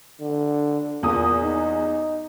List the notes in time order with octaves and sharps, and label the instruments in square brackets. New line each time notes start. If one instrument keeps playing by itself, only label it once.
[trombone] D3
[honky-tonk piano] E2 D#6 [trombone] A#2
[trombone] D#4